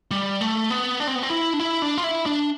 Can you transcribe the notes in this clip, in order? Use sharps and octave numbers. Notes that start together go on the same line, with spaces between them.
G3
A3
B3
D4
C4
B3
C4
E4
D4
E4
D4
F4
E4
D4